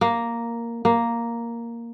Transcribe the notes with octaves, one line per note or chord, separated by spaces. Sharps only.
A#3
A#3